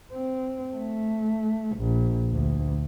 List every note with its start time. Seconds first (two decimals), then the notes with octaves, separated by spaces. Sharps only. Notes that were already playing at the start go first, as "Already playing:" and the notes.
0.13 C4
0.76 A3
1.77 A#1
2.32 D2